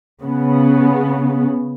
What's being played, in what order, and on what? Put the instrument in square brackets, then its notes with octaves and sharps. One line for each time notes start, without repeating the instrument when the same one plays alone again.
[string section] C#3 B3